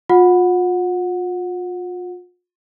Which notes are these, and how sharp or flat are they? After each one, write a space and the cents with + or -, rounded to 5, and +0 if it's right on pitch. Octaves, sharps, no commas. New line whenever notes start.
F4 +35 F#5 -15